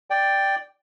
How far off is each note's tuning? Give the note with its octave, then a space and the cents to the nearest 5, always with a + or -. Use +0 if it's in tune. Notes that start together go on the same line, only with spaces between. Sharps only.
D5 +0 G5 +0